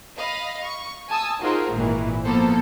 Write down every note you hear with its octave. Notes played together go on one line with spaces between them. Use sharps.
D#5 F5 B5
C#6
G#5 A5 D#6 E6
D#4 F4 F#4 G#4 A#4 C5
G#1 A#2 D#3 E3
F3 A#3 B3 A4 C5